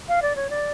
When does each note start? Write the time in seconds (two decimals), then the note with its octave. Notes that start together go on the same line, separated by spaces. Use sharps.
0.08 F5
0.22 D5
0.36 C#5
0.50 D5